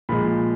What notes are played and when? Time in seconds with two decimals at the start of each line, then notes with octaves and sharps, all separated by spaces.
0.09 A#2 F3 G#3 B5